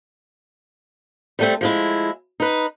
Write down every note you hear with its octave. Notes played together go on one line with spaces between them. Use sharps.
G3 A3 C4
F3 G#3 E4
D#4 B4